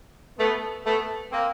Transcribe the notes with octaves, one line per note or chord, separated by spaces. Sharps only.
A3 B3
A3 B3
A#3 C4